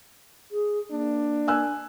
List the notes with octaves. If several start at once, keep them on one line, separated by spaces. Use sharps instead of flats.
G#4
A#3 D4
G#5 E6 F#6